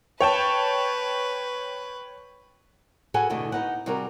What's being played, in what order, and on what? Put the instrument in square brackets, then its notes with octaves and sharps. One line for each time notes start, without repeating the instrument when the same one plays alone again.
[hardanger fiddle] B4 [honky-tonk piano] C#5 G5 A5
[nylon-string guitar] F#4 G#4 A4 B4 F#5 G#5
E2 B2 D3 A3 D#5
B3 D#4 F#5
C3 G3 F#4 G#4 A#4